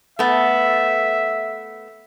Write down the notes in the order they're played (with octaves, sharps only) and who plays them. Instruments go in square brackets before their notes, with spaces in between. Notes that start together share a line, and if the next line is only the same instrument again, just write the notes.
[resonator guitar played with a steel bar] A3 B3 [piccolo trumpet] E5